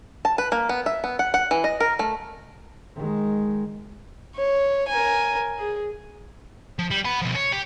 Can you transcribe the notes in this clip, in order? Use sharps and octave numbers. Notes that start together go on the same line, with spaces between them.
A5
B4
A#3
B3
E5
B3
F#5
F#5
E3
D#5
A#4
A3
D#3 G#3
C#5
A#4 G#5
G#4
F3
G3
F#5 B5
B2 F3
C#5
G4